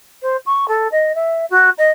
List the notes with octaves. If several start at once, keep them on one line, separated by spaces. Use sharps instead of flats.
C5
C#6
A4
D#5
E5
F#4
D#5